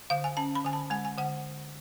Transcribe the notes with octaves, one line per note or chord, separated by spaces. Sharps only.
D3 F5
G#5
C#4 A5
B5
D3 G#5
A5
G#3 G#5
G#5
D3 F#5